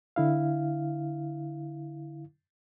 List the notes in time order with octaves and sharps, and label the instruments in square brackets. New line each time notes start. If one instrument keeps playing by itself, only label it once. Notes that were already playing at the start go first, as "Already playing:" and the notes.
[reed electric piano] D3 E4 F5